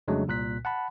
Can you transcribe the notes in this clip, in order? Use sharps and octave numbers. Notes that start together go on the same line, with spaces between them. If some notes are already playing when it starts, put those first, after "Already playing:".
F2 C#3 F#3 G#3 A3 D4
C2 A#2 F#6 B6
F#5 A5 B5